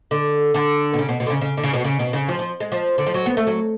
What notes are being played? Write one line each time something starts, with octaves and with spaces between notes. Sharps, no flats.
D3
D3
B2
C#3
B2
B2
D3
C#3
C#3
D3
C#3
B2
C#3
B2
C#3
F3
F3
G#3
F3
D3
F3
F#3
B3
A3
F#3